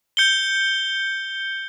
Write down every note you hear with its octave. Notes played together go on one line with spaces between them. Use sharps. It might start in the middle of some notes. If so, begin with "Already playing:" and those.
G6 C#7 G7